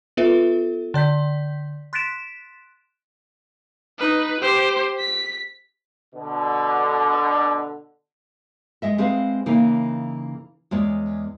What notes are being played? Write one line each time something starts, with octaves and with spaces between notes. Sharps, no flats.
B3 F4 A4 B4 E5
D3 D5 G6 B6
C6 F#6 A6 B6 D7 E7
D#4 B4
G4 C5
B6
B2 D3
G#3 D#5 E5
G#3 C4 G#4 B4 F5
C#3 E3 A#3 D#4
E2 G#3 C#5 D5